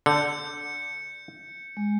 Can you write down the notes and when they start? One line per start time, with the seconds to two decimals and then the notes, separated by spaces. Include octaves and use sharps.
0.06 D3 G6 C#7
1.77 G#3